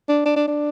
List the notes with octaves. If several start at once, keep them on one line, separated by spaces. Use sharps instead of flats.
D4
D4
D4
D4